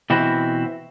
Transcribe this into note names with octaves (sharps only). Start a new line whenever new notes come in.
B2 E3 C4 E4 F#4